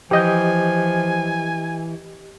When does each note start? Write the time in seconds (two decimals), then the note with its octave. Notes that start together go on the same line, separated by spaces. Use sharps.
0.11 E3 F3 G4 D#5 G#5 G6